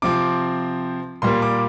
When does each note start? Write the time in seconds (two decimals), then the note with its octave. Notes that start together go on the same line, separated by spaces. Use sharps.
0.02 C3 F3 C4 D6
1.22 A#2 G3 A#3 C6
1.42 D6